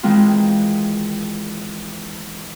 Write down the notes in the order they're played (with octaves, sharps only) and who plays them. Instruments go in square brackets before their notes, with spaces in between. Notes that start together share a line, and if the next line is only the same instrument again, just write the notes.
[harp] D#3 E3 G#3 C4 F4